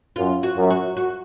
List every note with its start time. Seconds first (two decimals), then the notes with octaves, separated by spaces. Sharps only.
0.16 F#2 F4
0.43 F#4
0.57 F#2
0.70 F#4
0.97 F#4